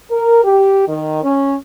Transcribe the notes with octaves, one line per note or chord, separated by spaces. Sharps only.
A#4
G4
D#3
C#4